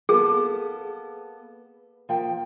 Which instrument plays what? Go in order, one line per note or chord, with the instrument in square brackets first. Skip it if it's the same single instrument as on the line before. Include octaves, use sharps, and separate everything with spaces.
[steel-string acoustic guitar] A#3 B3 A4 [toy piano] G#4
[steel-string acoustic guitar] F3 A#3 G5